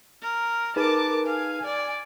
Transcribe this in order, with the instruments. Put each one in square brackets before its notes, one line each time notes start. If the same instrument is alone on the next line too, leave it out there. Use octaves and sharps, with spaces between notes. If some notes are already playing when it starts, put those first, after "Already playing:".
[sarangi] A#4
[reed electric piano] D#4 G#4 B4 [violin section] A#4 D6 [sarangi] A5
[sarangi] F5 [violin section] G#5
[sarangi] D5